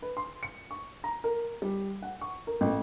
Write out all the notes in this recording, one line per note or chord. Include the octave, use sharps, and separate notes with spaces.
B4
C6
C#7
C#6
A#5
A#4
G3
F#5
C#6
A#4
A1